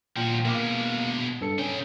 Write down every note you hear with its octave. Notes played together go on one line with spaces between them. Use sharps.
A#2 F3 F#4 G5
B2 G#3 A#3 F5 D6
G2 A4 C#7
C#3 C#4 G5